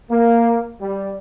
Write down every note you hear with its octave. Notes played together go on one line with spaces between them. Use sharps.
A#3
G3